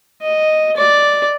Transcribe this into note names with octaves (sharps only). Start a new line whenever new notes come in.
D#5
D5